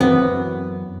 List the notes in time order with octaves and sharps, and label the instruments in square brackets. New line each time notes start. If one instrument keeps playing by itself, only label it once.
[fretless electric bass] F#2 E3 F#3 [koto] B3 [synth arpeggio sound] C4